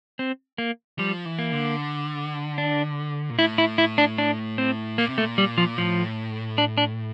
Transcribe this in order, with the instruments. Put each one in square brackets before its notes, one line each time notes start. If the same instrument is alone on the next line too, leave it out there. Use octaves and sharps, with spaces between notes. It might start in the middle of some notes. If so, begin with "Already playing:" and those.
[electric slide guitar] C4
A#3
[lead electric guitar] F3 [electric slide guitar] G3
[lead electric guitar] E3
[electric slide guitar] A#3
[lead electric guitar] D3
[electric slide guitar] D4
[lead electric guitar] A#2
[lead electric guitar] A2 [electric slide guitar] E4
[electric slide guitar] E4
E4
D4
D4
C4
[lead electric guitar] A#2 [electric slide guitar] A#3
[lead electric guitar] C3
[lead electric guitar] A#2 [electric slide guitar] A3
[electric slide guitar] G3
F3
[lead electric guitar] A2 [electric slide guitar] F3
[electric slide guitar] D4
D4